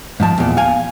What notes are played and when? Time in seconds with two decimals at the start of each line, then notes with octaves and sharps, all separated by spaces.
0.20 G#2 F3 A5
0.38 E2 A#2
0.57 F5 G#5